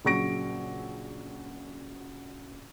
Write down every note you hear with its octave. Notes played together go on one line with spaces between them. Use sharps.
A#1 C#3 F#3 C#6 A#6 D7